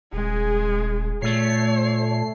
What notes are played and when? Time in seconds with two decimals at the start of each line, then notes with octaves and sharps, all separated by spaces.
0.13 D#1 G#3 G#4
1.22 A#2 A3 C#5 C7